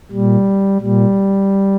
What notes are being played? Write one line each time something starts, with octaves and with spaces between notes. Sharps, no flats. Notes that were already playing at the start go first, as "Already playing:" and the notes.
A#2 G3
A#2 G3